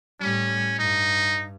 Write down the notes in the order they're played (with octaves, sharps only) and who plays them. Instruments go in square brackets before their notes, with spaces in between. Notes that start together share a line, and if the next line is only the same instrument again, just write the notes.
[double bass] A2 G3 [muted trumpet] C#4
[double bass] G2 [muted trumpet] D#4